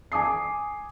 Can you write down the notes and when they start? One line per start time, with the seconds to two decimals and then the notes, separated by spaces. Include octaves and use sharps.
0.12 G#5 D6 D#6 C7